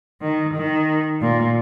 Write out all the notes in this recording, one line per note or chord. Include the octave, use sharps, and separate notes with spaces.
D#3
D#3
A#2